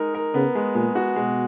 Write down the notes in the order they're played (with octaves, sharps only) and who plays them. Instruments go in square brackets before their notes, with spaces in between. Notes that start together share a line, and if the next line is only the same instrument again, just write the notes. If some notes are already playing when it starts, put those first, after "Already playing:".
Already playing: [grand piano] G#3 D#4 A#4
A#4
[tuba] C#3 [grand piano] B3
[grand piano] G#3
[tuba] A#2 [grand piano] G#3
[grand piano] F#4
[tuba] B2 [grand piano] G#3